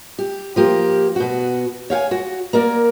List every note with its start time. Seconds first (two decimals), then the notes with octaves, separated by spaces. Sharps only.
0.19 G4
0.56 F3 A#3 G4
1.16 B2 F#4
1.90 C#5 F5 G5 G#5
2.11 F#4
2.53 A#3 A#4 D5